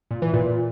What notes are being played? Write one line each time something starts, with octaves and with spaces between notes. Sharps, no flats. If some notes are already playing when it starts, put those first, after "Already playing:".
A#2
E3
A#2